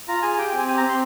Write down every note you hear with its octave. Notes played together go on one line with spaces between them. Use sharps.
F4 A#5
G#4 G#5
G4 G5
G5
C4 G#5
G4 G#5
A#5
C4 C6